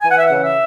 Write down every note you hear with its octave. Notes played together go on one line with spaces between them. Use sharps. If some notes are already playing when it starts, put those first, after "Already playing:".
E3 G#5
F#5
E5
C#3 F#5
E5